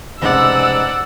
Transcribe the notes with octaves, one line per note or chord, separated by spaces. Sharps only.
F1 C#2 G#2 D5 F#5 D6 E6